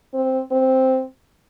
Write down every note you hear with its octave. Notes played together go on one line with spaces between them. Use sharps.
C4
C4